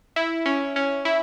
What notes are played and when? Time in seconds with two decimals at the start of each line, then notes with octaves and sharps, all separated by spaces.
0.16 E4
0.46 C#4
0.76 C#4
1.05 E4